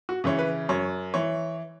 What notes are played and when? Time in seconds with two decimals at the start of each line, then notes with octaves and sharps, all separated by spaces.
0.09 F#4
0.24 C#3 E3 C#5
0.39 B4
0.69 F#2 C#5
1.14 E3 C#5